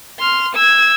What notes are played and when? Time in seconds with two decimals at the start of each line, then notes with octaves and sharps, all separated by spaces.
0.20 C6 F6
0.55 E6 G#6